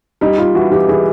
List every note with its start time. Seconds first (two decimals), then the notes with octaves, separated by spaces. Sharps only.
0.21 G3 D#4
0.38 G3 F4
0.55 E3 F#4
0.72 E3 G4
0.89 E3 G#4